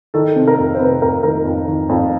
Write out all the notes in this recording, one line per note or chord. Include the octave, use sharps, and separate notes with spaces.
D#3 A4
C3
A#4
F2
C5
C3 B4
F2 A#4
D#3 A#4
F2
D#3
F2